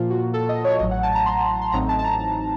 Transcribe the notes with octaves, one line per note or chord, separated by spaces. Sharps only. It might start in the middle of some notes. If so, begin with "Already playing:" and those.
Already playing: A#2 F3 A#3 F4
F#4
A4
D#5
C#5
A1 A2 F#3 D#5
F#5
A5
A#5
C6
C6
A1 A2 F#3 C4 D#4 A#5
A5
A5
A#5